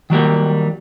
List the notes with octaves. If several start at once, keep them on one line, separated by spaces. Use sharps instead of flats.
D#3 F#3 G3 A#3